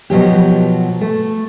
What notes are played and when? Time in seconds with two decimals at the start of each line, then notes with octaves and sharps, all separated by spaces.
0.10 B2 F3 F#3 G4
1.01 A3